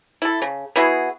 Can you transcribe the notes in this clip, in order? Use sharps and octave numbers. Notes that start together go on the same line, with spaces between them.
E4 A4
C#3
B3 E4 F#4 G#4